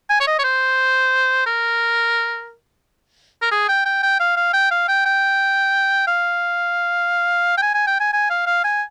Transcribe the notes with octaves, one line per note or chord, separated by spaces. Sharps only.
G#5
C#5
D#5
C#5
C5
A#4
A#4
G#4
G5
G5
G5
F5
F5
G5
F5
G5
G5
F5
G5
G#5
G#5
G5
G#5
G#5
F5
F5
G#5